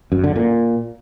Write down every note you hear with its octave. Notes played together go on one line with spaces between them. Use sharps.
F#2
D3
A#2